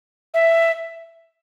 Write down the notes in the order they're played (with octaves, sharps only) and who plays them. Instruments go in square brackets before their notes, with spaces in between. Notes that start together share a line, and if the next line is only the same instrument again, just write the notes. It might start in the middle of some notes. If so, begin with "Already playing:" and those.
[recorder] E5